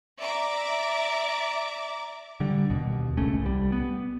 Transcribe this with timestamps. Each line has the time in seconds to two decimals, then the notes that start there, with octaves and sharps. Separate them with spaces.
0.19 D5 E5 A#5 D6
2.40 D3 G3
2.70 D#2 B2
3.17 G#1 C#2 A3 C#4
3.42 C2 G3
3.72 B3